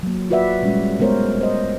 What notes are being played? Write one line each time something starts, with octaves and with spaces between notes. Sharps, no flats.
F#3 A#3
F4 F#4 B4 D5 E5 F#5
A#2 G3 G#3 C#4
G#3 A3 B3 A#4 C5 C#5
C5 D#5